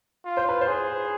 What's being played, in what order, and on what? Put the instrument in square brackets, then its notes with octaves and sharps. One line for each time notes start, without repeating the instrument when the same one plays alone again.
[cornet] F4
[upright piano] C5
B4
C5
[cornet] G#4